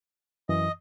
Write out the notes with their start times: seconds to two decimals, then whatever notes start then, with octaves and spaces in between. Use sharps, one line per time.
0.49 F#2 E3 D#5